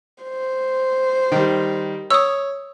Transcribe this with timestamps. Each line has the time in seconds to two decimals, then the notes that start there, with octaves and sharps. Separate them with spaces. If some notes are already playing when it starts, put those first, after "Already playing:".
0.24 C5
1.32 D#3 G3
2.10 C#5 D#6 E6